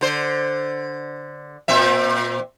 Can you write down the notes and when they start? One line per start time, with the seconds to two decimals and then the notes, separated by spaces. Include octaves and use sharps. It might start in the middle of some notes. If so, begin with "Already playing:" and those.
0.01 D3 C5
1.68 A#2 C4 E5